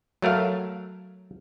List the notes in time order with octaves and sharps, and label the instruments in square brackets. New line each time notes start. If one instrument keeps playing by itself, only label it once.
[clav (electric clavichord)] F#3 A3 A#4 F5